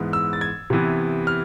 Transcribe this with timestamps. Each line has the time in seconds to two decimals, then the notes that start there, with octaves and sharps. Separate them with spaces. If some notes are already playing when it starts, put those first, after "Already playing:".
Already playing: G#2 E3 B3
0.13 E6
0.33 A6
0.41 G#6
0.70 C3 E3 B3
1.27 F6